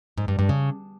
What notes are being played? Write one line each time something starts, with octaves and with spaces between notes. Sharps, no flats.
G#2
G2
G2
C#3